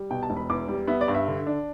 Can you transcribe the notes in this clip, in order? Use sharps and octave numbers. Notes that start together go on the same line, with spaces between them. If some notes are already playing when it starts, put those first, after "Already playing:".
Already playing: G3
B2 G5
A5
E1
B5
E2 D6
G3
B3 E5
D5
G2
E5
D3
D4